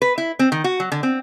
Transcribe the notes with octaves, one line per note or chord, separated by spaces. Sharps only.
B4
E4
C4
D#3
F#4
F#3
D3
C4